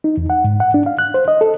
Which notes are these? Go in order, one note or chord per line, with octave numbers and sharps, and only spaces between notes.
D#4
E2
F#5
G#2
F#5
D4
F5
F#6
C5
D#5
A4